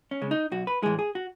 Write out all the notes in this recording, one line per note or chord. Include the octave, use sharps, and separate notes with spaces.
C#4
C#3 G#3
D#4
B1 F#4
B4
A2 E3 G#3 G#4
G#4
F#4